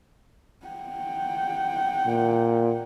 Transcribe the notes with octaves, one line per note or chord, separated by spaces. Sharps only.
F#5 G5
A#2